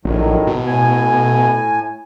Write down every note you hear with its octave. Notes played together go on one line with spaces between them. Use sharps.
A#1 A2 D#3 F#3
B2
A2 G#5